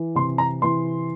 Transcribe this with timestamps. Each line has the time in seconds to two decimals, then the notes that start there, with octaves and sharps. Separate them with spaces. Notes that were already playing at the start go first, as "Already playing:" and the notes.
Already playing: E3
0.15 C3 C6
0.38 A#5
0.62 E3 C6